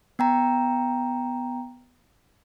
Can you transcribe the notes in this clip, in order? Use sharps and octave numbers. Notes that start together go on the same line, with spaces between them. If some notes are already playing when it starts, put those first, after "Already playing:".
B3 G5 A#5